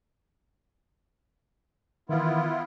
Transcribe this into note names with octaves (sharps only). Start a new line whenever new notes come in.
D#3 E3 B3 E4 F4